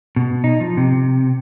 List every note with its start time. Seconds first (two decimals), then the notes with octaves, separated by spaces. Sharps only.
0.16 B2
0.44 D#4
0.60 F3
0.77 C3